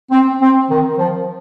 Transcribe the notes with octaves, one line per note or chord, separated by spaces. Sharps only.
C4
C4
D#3
F3